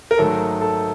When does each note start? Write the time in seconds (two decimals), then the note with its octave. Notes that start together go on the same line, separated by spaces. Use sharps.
0.11 A#4
0.18 G#2 D#3 F#3 A3 A4
0.61 A4